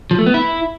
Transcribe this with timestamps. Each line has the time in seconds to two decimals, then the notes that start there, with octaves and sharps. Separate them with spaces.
0.11 F3
0.19 A3
0.26 B3
0.34 E4